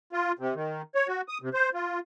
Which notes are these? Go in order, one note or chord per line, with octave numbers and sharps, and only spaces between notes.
F4
C3
D#3
C#5
F#4
D#6
C3
C5
F4